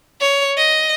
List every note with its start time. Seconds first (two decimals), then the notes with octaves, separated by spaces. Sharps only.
0.21 C#5
0.58 D#5